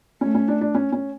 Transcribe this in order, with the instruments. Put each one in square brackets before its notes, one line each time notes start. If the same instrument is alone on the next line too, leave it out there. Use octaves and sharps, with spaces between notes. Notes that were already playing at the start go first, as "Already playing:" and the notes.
[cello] A3 [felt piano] C#4
[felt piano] C#4
D4
D4
C#4
C#4